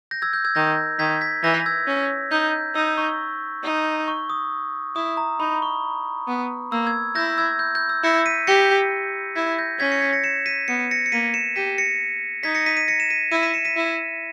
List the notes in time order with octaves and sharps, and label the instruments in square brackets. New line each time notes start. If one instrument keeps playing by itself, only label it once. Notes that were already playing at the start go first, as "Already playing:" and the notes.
[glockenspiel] G6 A#6
E6 G#6
G6
E6 G#6
[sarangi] D#3 [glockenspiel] G6 A#6
[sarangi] D#3 [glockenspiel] G#6 B6
[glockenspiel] G#6 B6
[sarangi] E3 [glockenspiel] G6 A#6
[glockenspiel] E6 G#6
[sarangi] C#4
[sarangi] D#4 [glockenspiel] G6
[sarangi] D#4 [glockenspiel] E6
[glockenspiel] C#6
[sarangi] D#4
[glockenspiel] C#6
D#6
[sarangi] E4 [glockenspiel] D#6
[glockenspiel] A#5
[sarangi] D#4 [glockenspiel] B5
[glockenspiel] C#6
[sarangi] B3
[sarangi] A#3 [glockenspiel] E6
[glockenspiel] E6 G#6
[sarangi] E4 [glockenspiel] G6 A#6
[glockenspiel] E6 G#6
G6
G6
E6
[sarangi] E4 [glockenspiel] A#6 C#7
[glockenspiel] B6 D#7
[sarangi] G4 [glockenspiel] A#6 C#7
[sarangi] E4 [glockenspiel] G#6 B6
[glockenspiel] G6 A#6
[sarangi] C#4 [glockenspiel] G#6 B6
[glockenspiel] A#6 C#7
G#6 B6
A#6 C#7
C#7 E7
B6 D#7
[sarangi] B3 [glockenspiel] C#7
[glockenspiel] D#7
A#6 C#7
C#7
[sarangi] A#3 [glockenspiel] B6 D#7
[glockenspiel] C#7 E7
[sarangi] G4 [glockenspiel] B6 D#7
[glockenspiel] A#6 C#7
[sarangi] D#4 [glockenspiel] G#6 B6
[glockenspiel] A#6 C#7
B6 D#7
B6 D#7
A#6 C#7
E7
B6 D#7
[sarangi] E4 [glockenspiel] B6 D#7
[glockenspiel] B6 D#7
C#7 E7
B6 D#7
[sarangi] E4